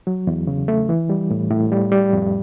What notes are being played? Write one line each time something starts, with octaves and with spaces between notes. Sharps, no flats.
F#3
E2
C#3
A3
E3
G3
A2
A2
G3
G3
F2